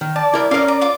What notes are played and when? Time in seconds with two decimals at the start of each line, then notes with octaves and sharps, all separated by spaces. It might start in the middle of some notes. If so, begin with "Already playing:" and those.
0.01 D#3
0.16 D5 A5
0.34 E4 A#4
0.51 C#4 A#4 D#5 F5
0.68 A#5
0.81 F4 D6